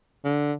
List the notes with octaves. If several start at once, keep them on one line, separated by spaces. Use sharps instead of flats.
D3